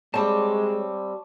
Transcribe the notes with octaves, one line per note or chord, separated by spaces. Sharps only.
G3 G#3 C4 C#5 A5 D6